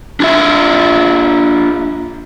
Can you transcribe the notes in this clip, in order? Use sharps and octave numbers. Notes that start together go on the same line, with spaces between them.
D4 F4 E5